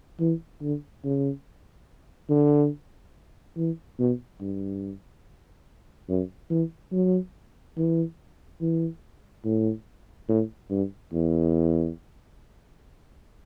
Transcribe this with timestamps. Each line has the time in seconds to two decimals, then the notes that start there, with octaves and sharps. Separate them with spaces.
0.20 E3
0.61 D3
1.04 C#3
2.30 D3
3.57 E3
3.99 B2
4.41 G2
6.09 F#2
6.50 E3
6.92 F#3
7.77 E3
8.61 E3
9.45 A2
10.29 A2
10.70 G2
11.13 E2